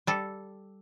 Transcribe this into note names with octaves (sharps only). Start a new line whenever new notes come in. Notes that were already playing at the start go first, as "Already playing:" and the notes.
G3 A4